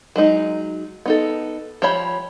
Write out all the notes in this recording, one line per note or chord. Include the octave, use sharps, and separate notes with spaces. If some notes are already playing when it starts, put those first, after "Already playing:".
F#3 G#3 D#4
B3 D#4 A4
F3 G4 C#5 B5